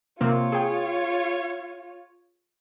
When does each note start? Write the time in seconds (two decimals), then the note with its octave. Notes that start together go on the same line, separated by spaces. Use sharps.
0.21 C3 A#3 C4 F4 C#5
0.52 G#4 G5